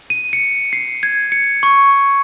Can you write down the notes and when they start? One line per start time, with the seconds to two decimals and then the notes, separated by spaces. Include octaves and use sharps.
0.10 D#7
0.33 C#7
0.73 C7
1.03 G#6
1.32 C#7
1.63 C#6